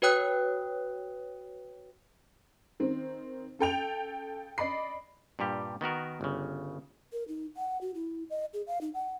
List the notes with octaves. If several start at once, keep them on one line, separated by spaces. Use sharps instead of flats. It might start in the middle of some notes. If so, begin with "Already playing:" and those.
F#4 B4 C#5 G5 D#6 F#6
D#3 C4
C#3 A4 G5 F7
D5 D#5 B5 C7
G2 A#2 G3 G4
D#3 B3 F#4 A#4
G1 C#3
A#4
D#4
F#5
F#4
E4
D#5
G#4
F5
D#4
F#5